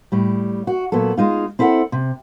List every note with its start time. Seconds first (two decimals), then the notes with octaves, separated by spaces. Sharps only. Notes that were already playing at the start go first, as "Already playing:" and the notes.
0.12 A2 G3
0.67 F#4
0.92 A#2 F#3 B3 A4
1.17 G#3 D#4 F4
1.59 C4 E4 A4 F5 F#5
1.92 C3